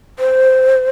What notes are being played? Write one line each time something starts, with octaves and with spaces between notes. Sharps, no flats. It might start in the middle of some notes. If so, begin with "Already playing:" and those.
C5